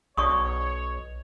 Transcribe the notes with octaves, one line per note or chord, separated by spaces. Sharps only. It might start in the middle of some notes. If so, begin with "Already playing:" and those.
B1 C#5 D5 C#6 D#6